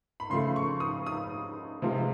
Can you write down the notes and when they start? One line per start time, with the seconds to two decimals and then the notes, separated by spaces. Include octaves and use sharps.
0.20 B5
0.30 C#3 F3 A3 C6
0.56 C#6
0.80 D#6
1.07 D#6
1.82 C3 F3 G#3